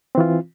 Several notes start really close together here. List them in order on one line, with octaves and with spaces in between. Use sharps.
C4 E3 F4